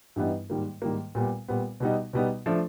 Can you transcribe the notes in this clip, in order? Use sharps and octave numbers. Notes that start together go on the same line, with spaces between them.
G2 E3 G3 B3 D#4
G#2 D#3 G3 A#3
G#2 D#3 G3 A#3
A#2 G3 B3
A#2 G3 B3
B2 G3 B3 D#4
B2 G3 B3 D#4
F3 A3 D4